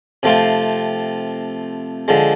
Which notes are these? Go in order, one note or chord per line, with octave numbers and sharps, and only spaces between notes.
C3 F3 A3 C4 F4
D3 F3 G#3